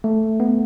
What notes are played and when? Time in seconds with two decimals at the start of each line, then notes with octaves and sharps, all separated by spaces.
0.04 A3
0.40 B3